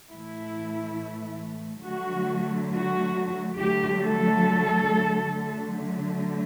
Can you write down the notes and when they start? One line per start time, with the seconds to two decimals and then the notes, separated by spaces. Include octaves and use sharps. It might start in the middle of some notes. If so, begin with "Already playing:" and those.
0.10 A2 E3 A3 E4
1.85 D3 F#3 A3 F#4
2.72 F#4
3.59 D3 F#3 A3 G4
4.02 A4
5.34 D3 F#3 A3